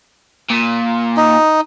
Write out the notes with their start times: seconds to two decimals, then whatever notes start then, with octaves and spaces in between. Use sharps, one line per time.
0.50 A#2
1.17 D#4